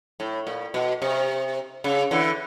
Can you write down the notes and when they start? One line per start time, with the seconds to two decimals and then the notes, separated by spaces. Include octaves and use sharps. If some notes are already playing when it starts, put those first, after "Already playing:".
0.20 A2
0.47 A#2
0.74 B2
1.02 C3
1.84 C#3
2.11 D3 E3